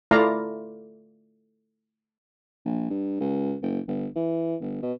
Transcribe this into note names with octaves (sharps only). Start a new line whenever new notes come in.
A3 E4 F4 D5 F5 A#5
A#1
G2
C#2
F#1
G1
E3
G1
B2